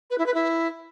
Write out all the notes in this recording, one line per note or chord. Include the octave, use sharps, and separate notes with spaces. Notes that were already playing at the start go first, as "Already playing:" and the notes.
B4
E4
B4
E4